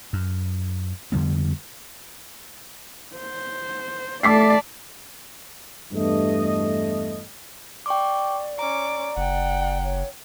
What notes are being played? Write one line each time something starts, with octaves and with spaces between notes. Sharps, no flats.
F#2
F2 D3 G3 B3
C5
A3 D5 A5 D6 B6 C7
E2 G2 A3 D#5
D5 G5 C#6 D6
C#4 A#5 D6
F#1 F#5 G5
C#5